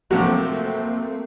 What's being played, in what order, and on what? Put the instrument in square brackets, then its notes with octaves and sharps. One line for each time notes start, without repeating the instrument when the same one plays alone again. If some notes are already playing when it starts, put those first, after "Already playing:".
[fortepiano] C3 F3 F#3 [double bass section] A3 C4 [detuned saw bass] A#3 [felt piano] F#4